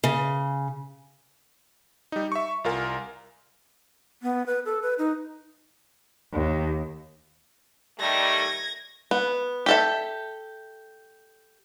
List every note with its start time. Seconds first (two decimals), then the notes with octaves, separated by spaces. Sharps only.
0.04 C#3
2.12 G3 D#4
2.32 E5 C#6
2.64 C2 F4 A#4 G#5
4.22 B3
4.46 B4
4.65 A4
4.82 B4
4.99 D#4
6.33 D#2
7.99 D#3 G3 A3 G#6 A#6
9.11 B3
9.66 G4 A4 E5